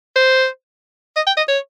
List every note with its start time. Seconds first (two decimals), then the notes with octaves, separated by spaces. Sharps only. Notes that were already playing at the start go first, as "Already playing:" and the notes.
0.16 C5
1.16 D#5
1.27 G5
1.37 D#5
1.48 C#5